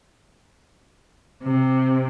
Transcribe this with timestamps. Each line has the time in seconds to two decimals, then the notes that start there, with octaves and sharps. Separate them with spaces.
1.42 C3